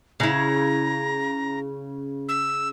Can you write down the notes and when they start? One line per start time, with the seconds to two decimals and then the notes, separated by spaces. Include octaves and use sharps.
0.20 C#3 E4 A#5
2.29 E6